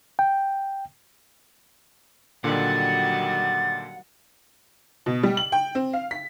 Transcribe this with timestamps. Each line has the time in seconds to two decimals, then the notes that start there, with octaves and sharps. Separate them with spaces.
0.19 G5
2.44 A#2 D3 D#3 F#3 G3 F#5 A6
5.06 B2
5.23 G3
5.37 F#7
5.52 G5
5.75 C4
5.93 F5
6.11 B6